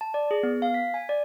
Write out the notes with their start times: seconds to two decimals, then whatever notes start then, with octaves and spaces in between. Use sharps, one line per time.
0.01 A5
0.14 D5
0.31 G#4
0.43 B3
0.62 F5
0.74 B6
0.94 G#5
1.09 D5